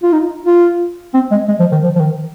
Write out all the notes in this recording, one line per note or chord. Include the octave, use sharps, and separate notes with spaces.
F4
D#4
F4
C4
G#3
G#3
F3
D#3
F3
F3
D#3